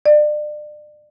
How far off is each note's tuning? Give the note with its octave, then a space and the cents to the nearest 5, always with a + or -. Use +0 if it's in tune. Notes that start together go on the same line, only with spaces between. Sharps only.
D5 +35